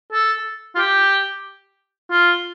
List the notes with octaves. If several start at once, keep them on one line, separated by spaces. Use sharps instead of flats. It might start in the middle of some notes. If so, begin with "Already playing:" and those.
A4
F4
G4
F4